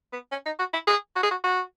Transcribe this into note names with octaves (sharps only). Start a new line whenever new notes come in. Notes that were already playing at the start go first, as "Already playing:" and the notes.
B3
C#4
D#4
F#4
E4
G#4
F#4
G#4
F#4
F#4